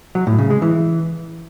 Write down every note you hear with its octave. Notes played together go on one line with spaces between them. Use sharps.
F#3
A2
C#3
G#3
E3